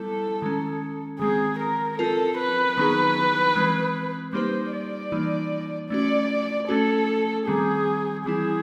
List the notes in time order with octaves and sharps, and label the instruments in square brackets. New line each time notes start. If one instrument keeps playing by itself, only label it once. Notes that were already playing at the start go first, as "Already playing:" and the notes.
Already playing: [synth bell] G3 B3 E4 [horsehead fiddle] A4
[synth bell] D#3 G#3 C#4
[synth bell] D#3 G#3 C4 [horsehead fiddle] G#4
[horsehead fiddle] A#4
[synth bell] C4 F4 A#4 [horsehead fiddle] A4
[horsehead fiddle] B4
[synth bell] D#3 F#3 B3 D#4 G#4
E3 G#3 C4
[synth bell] G3 A#3 D#4 G4 B4 [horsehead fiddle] C5
[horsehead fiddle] D5
[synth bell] E3 G3 A#3 D#4
[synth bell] A3 C#4 F#4 [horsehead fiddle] D5
[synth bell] A3 C#4 F#4 [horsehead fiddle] A4
[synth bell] D#3 G3 C4 [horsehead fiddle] G#4
[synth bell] E3 G3 C4 E4 [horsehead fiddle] G#4